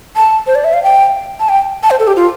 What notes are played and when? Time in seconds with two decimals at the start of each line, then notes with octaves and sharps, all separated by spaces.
0.16 A5
0.47 C5
0.55 D5
0.64 E5
0.73 F5
0.83 G5
1.40 A5
1.49 G5
1.83 A5
1.91 C5
1.99 A4
2.07 G4
2.16 F4